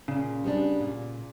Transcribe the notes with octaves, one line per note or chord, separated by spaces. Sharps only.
A#2 C#3
G3 B3 D4
A#2